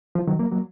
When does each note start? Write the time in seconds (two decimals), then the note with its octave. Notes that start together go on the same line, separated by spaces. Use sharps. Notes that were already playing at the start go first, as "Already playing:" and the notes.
0.15 F3
0.27 D#3 F#3
0.39 F#3 A#3
0.52 F#3 A#3